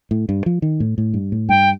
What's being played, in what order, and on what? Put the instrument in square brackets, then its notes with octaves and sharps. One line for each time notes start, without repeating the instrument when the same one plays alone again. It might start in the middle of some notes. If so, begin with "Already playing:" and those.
[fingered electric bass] A2
G2
F3
D#3
A2
A2
G2
A2
[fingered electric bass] G2 [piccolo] G5